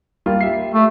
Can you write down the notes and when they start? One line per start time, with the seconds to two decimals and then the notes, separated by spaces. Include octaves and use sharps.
0.26 G3 A#3 F4
0.41 G4 E5 C7
0.74 A3